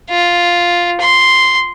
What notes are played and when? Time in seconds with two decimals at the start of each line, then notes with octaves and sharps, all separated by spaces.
0.10 F4
1.01 C6